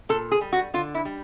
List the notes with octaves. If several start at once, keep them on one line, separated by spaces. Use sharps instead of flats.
A#2 A4
G#4
G3
F#4
D3 F4
E4
G3